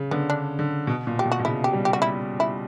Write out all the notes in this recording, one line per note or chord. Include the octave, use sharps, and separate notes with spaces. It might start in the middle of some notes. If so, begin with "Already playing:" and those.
Already playing: C#3
D3 B3
D4
D3
B2
A#2
G4
B2
F#4
B2
C#3 E4
G4
G3
G4
F#4
E4
E4